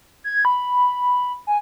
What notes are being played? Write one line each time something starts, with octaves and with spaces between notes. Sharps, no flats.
G#6
B5
G#5